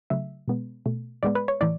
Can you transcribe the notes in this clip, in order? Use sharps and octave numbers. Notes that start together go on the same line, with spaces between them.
C#3 F#3 A3 E5
B2 G#3 B3
B2 A3
A2 G#3 B3 D5
B4
C#5
A2 E3 D5